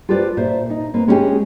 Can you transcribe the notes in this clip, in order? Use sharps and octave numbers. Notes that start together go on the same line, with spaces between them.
F4 G4 A4 B4 C5 D5
A#2 C5 E5
D#4
A#3 C4 B4
G#3 C#4 E4 F4 G4 G#4